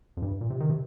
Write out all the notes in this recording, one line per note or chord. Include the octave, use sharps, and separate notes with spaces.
F2
G2
A#2
C3
D#3
C3